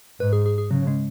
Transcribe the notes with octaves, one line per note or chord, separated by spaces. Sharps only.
G#2 B4
G#4
G#4
G#4
C#3 F#3
G#3